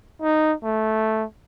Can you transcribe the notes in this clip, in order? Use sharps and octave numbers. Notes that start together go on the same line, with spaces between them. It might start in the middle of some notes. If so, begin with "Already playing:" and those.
D#4
A3